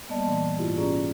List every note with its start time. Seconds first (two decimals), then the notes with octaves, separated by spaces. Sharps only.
0.08 G3 A#3 B3 D5 D#5 A5
0.24 A#2 E3 D5 A5 C6
0.58 G#2 C3 E4 F4 G4
0.77 C#4 F4 G4 G#4 D5 A#5